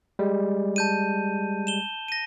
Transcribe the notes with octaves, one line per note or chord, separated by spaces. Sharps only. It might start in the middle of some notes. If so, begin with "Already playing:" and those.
G3 G#3
A5 G6 D#7
E7 G7
A#6 D#7